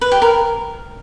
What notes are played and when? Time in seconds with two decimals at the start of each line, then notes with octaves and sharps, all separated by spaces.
0.01 B4
0.12 G4
0.22 A#4